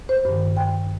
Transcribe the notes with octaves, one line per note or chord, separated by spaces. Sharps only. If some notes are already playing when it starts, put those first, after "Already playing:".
C5
G2 D#3
G5